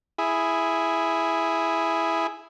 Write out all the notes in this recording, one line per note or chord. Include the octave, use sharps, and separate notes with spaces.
E4 G#4